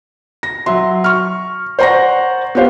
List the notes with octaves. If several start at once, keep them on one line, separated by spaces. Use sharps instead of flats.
A#6
F#3 E5 C6
C#6 F6
C5 D5 F#5 A#5 C#6 A#6
B3 F4 G4 C5 F5